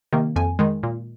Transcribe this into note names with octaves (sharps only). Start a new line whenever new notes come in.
C3 D#3 A#3
F2 G#5
D#3 G#3
A#2